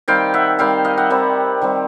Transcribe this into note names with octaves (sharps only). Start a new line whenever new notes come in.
D#3 G3 C4 F5 G5
E5 F#5
D#3 G3 C4 F5 G5
D#5 F5
E5 F#5
D#3 G3 C4
D#3 G3 C4